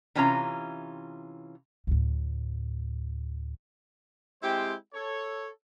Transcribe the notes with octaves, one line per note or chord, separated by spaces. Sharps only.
C3 E3 C#4 F4 G#4 A#5
D2 A2
G#3 C4 E4 G4 C5 G5
A4 C#5